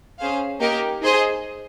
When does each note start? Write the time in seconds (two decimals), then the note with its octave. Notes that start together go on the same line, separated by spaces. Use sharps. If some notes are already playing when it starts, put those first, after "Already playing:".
0.19 C#4 G#4 C5 F5
0.60 A#3 D#4 G4 A#4
1.02 D#4 G#4 C5 D#5